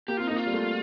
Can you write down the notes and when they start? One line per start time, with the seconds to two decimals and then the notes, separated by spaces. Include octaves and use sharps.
0.08 A#3 G4
0.17 C4 F4
0.27 A#3 D#4
0.36 F4
0.47 G3
0.53 A3